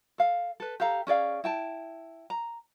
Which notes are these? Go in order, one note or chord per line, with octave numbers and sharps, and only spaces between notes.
A4 F5
A4 B4
G4 A4 F5 A#5
C#4 G#4 D5 F5
E4 G5 A5
A#5